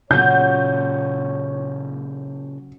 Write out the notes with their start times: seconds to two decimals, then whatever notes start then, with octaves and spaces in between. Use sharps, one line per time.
0.11 A#2 C#3 F#3 C#4 F#4 C#5 G6